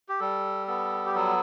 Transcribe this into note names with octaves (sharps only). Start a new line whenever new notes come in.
G4
G3 A4
B3 A4
G4
F#3 A4